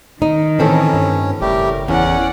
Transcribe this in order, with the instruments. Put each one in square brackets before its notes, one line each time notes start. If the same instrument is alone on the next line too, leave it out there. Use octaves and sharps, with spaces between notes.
[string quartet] D#3 [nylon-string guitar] D#4
[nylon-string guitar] A2 C4 A4 [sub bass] E3 [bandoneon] C#4
[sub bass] G2
[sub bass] F#1 [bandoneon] G3 A3 G4 [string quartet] A#4
[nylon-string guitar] E2 [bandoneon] C#4 [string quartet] D5 F#5